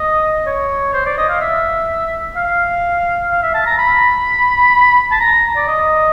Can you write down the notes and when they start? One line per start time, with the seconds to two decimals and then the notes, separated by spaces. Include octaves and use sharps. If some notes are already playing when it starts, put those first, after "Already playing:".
Already playing: D#5
0.46 C#5
0.94 C5
1.06 D5
1.18 D#5
1.29 F5
1.41 E5
2.36 F5
3.31 F5
3.42 E5
3.54 A5
3.66 A#5
3.78 B5
5.11 A5
5.20 A#5
5.56 D5
5.68 D#5